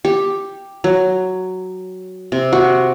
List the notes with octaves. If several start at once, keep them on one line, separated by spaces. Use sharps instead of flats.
G4
F#3
C3
F#4